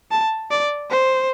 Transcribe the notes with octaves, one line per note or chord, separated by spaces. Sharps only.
A5
D5
C5